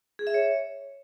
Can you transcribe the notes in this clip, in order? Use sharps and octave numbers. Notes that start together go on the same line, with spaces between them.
G#4
E5
C#5